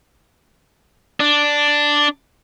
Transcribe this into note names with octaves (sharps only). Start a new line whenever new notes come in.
D4